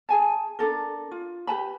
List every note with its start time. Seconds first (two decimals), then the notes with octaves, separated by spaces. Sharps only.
0.09 G#4 G#5 A5
0.59 D4 D#4 A4 A#4
1.12 F4
1.47 G4 B4 A5 B5